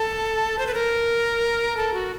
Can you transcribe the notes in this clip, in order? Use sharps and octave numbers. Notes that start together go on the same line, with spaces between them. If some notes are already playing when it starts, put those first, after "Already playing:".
Already playing: A4
C5
B4
A#4
A4
F#4